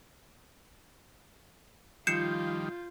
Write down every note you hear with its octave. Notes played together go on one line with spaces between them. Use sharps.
D#3 F3 G3 F4 G6 C7 C#7 E7